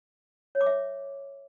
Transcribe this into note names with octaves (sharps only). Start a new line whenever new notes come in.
C#5
D6
E5